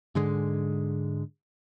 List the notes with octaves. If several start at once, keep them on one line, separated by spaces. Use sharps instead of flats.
G#2 D3 G#3